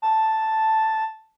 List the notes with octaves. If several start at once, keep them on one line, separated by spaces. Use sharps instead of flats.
A5